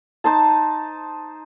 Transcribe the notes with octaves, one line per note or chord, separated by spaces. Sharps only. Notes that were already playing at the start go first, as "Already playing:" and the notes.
D#4 C5 A5